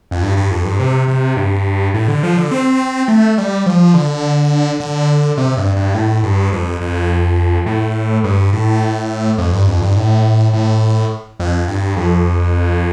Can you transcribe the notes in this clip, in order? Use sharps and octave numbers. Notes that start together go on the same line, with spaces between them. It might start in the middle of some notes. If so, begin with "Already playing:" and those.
F2
G2
G2
F2
G2
C3
C3
G2
A2
D3
F3
D3
C4
A3
G3
F3
D3
D3
C3
G2
G2
A2
G2
F2
F2
A2
G2
A2
F2
G2
F2
G2
A2
A2
F2
G2
F2